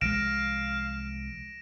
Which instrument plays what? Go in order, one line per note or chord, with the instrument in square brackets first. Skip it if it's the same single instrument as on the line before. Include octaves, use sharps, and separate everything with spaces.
[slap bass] C2 F3 G#3 [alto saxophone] F5 [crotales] A#6 D7 E7